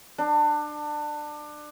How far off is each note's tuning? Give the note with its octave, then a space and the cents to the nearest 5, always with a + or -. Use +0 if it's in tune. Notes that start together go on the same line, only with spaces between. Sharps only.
D4 +25